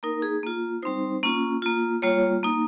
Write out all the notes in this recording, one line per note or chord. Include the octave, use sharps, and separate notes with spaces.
A#3 D#4 A#4
G#4
A#3 F4
G3 C4 D#4 C5
A#3 C#4 F4
A#3 F4
G3 A#3 F4 C#5
A#3 D#4